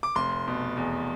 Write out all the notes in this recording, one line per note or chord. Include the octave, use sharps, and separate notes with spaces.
D6
F1 C6
B2
E2